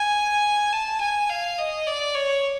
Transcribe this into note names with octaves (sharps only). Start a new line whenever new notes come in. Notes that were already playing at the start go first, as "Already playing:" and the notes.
Already playing: G#5
A5
G#5
F5
D#5
D5
C#5